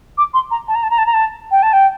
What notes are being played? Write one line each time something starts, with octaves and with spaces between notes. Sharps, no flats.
D6
C6
A#5
A5
A#5
A5
A#5
A5
A#5
A5
G5
A5
G5